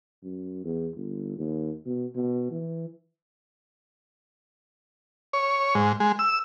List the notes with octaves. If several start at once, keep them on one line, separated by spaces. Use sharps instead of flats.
F#2
E2
G1
D#2
B2
B2
E3
C#5
G#2
G#3
E6